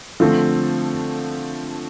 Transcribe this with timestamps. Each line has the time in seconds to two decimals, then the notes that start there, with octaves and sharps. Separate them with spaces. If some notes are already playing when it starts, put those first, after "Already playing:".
0.20 D3 F3 A3 C4